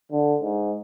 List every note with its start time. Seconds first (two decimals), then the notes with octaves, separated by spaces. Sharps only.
0.12 D3
0.42 G#2